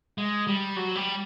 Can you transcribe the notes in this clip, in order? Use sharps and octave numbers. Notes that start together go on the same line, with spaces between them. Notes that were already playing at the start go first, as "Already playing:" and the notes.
G#3
G3
F#3
G3